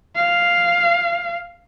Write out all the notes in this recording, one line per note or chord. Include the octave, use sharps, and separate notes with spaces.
F5